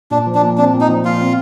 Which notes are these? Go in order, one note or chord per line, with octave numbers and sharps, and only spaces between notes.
A#2 D4
F3
D4
A#2
C4 D4
A#2
D#4
F3
A#2 F4
C4